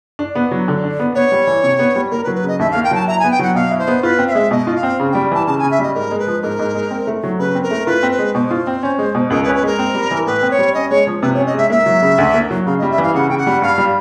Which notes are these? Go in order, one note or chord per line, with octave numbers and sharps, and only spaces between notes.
D4
B3
F#3
D3
D4
B3
B3 C#5
G3
E3
C3
B3
G3
A#3 A#4
B4
F#3
B4
C#3 D#5
D#2 E5
A#3 F5
G5
F#3 A5
E4 A#5
B3 G#5
G5
F#3 F#5
B2 F5
E4
C5
B3
F4 B4
C4
F5
G#3 E5
B2 D#5
F4
F5
C4
C#3
G3 G5
E3 A5
C#3 A5
C#3 G#5
E5
G3 D#5
G#2 A#4
G#3
B4
F3
G#2 A#4
G#2
G#3
C4
A3
F#3
C#3 B4
C4
A#4
A3
F4 B4
C4
B4
G#3
B2 C5
F4
C4
C#4
G#3
B2
C#2 A#4
B4
C#4
B4
G#3 A#4
C4
G3
E3
A2 B4
C4
C#5
G3
C#4 D#5
G#3 C#5
F3
C3 B4
C#4 C#5
D#5
G#3 E5
A#3 E5
F#3
C#3
D2
A#3
F#3
C#3 F5
G3 D#5
E5
E3 F5
C#3 F#5
C#3 G5
F#5
G3
G2 F5
G3